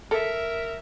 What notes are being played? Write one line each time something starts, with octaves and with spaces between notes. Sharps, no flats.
A4 A#4 E5